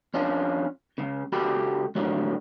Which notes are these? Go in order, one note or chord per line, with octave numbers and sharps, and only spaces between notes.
F2 C#4 D4 F4
C#2 G#2 C#3
C#2 F#4 G4 A4 B5
A2 D3 F#3 G#3